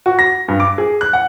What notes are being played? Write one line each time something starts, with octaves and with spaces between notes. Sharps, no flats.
F#4
A#6
G2
D6
G#4
F#6
F#5